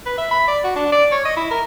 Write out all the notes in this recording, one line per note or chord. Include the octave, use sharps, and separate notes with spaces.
B4
E5
B5
D5
F#4
D4
D5
C#5
D#5
E4
A#4